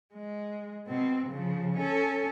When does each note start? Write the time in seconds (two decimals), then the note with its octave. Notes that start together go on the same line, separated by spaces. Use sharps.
0.15 G#3
0.87 B2 C4
1.28 C#3 F3
1.78 C#4 A4